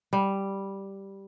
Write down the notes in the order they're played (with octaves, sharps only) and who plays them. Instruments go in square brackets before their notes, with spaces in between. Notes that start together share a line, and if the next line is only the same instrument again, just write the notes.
[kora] G3